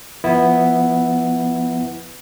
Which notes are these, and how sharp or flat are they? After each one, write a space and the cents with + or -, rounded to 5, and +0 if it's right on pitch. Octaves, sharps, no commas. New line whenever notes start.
F3 -20 B3 +0 E4 -5